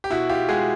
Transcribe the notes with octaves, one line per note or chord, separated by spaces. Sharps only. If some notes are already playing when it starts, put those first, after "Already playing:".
G4
B2 E4 F#4
F4 G4
G#3 F#4 G#4